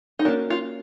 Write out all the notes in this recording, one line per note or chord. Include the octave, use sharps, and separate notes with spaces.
D#4
A#3 C#4 D4 F#4 A#4
F4